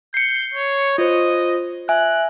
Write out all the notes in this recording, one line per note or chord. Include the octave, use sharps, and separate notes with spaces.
G6 C7 C#7
C#5
F4 C5 D#5
E5 G#5 F#6